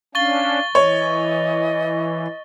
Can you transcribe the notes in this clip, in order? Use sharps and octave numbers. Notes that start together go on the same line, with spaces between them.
C#4 D4 F5 C#6 A6 G7
E3 C#5 D#5